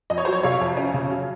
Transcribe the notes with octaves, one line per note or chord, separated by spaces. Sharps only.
F2 D#5
C#5
F#3 C5
C#5
C3 C#5 F5
F2
C#4
C#3
F#3